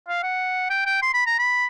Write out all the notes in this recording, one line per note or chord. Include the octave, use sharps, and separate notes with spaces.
F5
F#5
G5
G5
C6
B5
A#5
B5